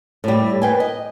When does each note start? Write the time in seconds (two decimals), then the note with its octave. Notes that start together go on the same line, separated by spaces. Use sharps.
0.24 A2 G3
0.62 B4 G5 G#5
0.80 D#5